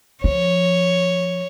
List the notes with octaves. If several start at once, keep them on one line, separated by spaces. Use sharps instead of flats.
F3 C#5